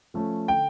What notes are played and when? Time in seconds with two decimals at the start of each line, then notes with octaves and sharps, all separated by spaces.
0.14 F3 A3 C#4
0.48 D3 G5